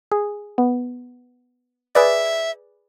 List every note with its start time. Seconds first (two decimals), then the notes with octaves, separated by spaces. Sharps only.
0.11 G#4
0.58 B3
1.95 G#4 B4 D5 E5